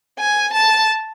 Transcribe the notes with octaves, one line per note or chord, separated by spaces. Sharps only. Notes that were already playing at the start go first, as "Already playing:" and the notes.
G#5
A5